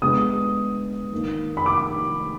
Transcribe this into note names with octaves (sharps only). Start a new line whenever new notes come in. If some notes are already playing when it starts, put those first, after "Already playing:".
D3 G#3 B3 D#6
D#3 A#3
B5
D6